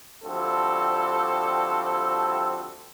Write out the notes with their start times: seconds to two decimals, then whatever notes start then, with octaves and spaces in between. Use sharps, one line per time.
0.24 D2 F3 G3 C4 A4